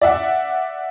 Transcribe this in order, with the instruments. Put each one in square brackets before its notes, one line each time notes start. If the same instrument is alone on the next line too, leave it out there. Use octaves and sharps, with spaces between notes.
[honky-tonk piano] D5 E5 F#5